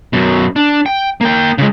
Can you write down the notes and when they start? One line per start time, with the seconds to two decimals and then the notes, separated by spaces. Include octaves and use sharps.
0.13 F#2 B2
0.56 D4
0.86 G5
1.21 A#3 G5
1.58 C#3 G#3